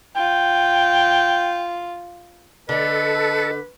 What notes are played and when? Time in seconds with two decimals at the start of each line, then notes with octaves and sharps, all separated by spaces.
0.16 F4 G5
2.69 D3 D4 A4 B4 D#5